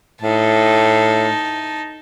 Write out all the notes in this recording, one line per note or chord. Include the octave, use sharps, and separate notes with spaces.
A2 D#4 A5